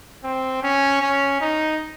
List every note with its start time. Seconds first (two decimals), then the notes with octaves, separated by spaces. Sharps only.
0.24 C4
0.63 C#4
1.02 C#4
1.41 D#4